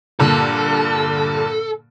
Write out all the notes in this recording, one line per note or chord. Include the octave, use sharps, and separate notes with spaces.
G2 A#2 D3 A4